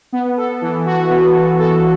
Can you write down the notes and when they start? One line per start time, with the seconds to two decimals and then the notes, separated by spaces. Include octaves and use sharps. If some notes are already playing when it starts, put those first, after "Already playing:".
0.13 B3
0.37 A4
0.62 E3
0.86 F#4
1.10 B3
1.35 A4
1.59 A4